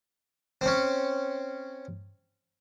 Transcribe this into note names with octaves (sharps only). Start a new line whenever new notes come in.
C4 C#4